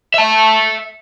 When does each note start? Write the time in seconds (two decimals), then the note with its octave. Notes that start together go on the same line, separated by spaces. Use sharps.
0.14 E5 A5